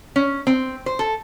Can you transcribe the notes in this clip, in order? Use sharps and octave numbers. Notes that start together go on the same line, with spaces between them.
C#4
C4
C5
A4